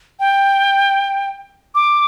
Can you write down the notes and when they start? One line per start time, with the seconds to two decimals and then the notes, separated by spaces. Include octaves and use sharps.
0.20 G5
1.75 D6